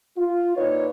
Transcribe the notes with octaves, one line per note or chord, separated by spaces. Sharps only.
F4
A#2 D#4 B4 C#5